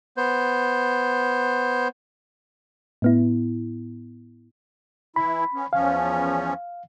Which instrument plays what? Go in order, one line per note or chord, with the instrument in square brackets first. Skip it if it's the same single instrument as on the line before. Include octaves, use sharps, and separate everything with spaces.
[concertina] B3 C5
[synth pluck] A2 B3 E4
[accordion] E3 E4 [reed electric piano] B5
[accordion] B3 C#4
[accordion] E2 F3 C#4 [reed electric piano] F5